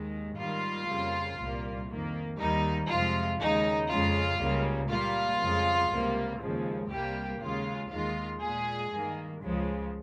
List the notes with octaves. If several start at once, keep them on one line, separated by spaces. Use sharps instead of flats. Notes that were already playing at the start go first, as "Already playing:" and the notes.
Already playing: D#2 D#3 G#3
G#2 D#3 G3 A#3 F4
F2 C#3 G3 A#3
C2 A#2 G3 A#3
F2 D#3 A#3
D#2 D#3 G3 A#3 D#4
F2 C3 F3 G#3 F4
D#2 C#3 G#3 D#4
F2 C#3 G#3 F4
C#2 C#3 G3 A#3
A#2 G3 A#3 F4
F2 C#3 G#3
C#2 C3 G3 A#3
D#2 C#3 F3 G#3
C2 C3 G3 A#3 G4
D#2 C#3 G#3 F4
D#2 D#3 G#3 F4
A#2 G#3 G#4
G2 D#3 A#3
C#2 C#3 F3 G#3